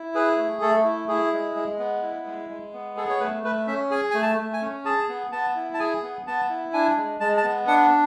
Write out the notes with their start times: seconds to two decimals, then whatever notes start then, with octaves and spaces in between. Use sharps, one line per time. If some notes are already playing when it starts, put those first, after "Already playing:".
Already playing: E4
0.15 G#4 B4
0.37 A3
0.61 A3 A4
0.84 E4
1.08 E4 G#4
1.33 G#3
1.56 G#3
1.79 B3
2.03 E4
2.26 G#3
2.50 G#3
2.73 B3
2.97 G#4 A4
3.09 C#5
3.20 A3 B4
3.44 A3 B4
3.67 C#4 E5
3.90 G#4 G#5
4.10 A3 G#5
4.22 A5
4.38 A3
4.53 G#5
4.61 C#4
4.85 G#4 A5
5.09 B3
5.32 B3 A5
5.56 E4
5.74 A5
5.79 G#4 G#5
6.03 B3
6.27 B3 A5
6.50 E4
6.73 D4 G#5
6.97 G#3
7.20 G#3 A5
7.37 A5
7.44 B3
7.67 D4 F#5